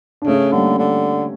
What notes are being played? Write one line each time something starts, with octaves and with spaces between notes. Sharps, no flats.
D4
C#3 A3 C#4
D3 G3 A#3
D3